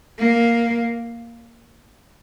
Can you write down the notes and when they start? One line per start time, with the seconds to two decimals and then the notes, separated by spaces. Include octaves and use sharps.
0.19 A#3